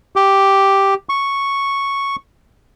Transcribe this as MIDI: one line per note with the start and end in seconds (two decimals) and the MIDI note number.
0.16 0.94 67
1.09 2.16 85